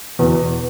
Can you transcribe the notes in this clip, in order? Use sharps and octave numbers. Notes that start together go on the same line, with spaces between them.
E2 B2